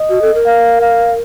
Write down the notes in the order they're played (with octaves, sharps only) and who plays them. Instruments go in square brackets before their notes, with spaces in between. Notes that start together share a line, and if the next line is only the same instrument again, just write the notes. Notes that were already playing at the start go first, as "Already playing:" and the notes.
Already playing: [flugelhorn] D#5
[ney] F#4
A4
A#4
[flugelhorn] F5
F5